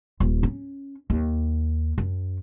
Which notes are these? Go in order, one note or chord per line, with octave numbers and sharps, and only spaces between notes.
D#1
C#4
D#2
F#2